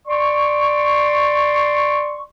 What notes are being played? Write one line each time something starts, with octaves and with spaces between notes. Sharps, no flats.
D5 C6 C#6